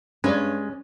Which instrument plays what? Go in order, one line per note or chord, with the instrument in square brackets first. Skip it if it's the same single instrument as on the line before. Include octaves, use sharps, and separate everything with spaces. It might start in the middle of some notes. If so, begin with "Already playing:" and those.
[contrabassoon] G2 [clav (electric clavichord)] G#3 [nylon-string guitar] C#4 [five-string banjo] B4 C#5 D5